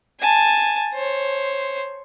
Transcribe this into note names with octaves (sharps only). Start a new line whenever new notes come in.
G#5 A5
C5 C#5